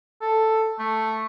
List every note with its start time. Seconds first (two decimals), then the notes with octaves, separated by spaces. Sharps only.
0.22 A4
0.79 A3